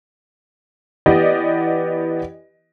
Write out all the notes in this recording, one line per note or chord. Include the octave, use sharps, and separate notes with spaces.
E3 B3 G4 D5 D#5